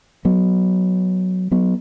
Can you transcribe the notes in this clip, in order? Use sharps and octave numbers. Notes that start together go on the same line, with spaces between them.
F#3 B3
F#3 B3